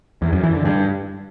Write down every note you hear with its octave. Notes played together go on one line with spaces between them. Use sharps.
E2
F#2
E3
D3
G2